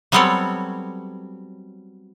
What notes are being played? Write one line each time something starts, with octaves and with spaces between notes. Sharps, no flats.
F#3 G3 B3 C4 A4 C#5